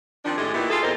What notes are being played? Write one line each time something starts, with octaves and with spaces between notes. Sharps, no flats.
D#3 F3 C4 D4
A2 G#3 A3 G4 G#4
A#2 E3 D#4 E4 F#4 G4
F4 G#4 A4
E2 A#2 C4 D#4 A#4 C5